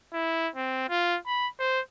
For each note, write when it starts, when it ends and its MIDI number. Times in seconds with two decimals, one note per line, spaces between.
0.13 0.48 64
0.56 0.87 60
0.89 1.17 65
1.27 1.47 83
1.59 1.80 72